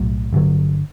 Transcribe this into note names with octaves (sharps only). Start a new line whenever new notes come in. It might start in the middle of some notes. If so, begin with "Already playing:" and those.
Already playing: B1 A2 F#3
G1 F#2 D3 F#3